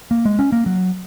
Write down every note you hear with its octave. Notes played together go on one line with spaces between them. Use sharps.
A#3
G#3
C#4
A#3
F#3